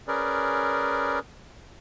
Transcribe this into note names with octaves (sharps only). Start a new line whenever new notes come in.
C#4 G#4 A#4 B4 D5